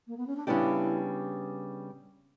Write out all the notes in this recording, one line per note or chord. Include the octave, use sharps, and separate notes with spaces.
A#3
B3
C#4
D4
C#3 G3 B3 D4 E4 G4